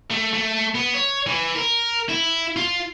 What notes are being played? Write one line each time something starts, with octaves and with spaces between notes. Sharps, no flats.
A3
A3
B3
C#5
E3
A#4
E4
F4